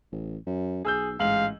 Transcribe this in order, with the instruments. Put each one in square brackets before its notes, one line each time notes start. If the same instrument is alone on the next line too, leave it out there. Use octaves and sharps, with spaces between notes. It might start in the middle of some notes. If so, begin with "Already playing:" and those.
[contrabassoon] A1
F#2
[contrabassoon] B1 [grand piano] G#4 E6 G6
[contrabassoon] A1 [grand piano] G#2 F#7 [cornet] F5